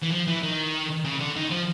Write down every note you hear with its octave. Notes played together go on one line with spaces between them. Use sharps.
E3
F3
E3
D#3
C#3
D3
D#3
F3